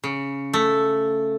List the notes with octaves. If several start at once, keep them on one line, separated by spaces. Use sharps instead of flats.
C#3
A3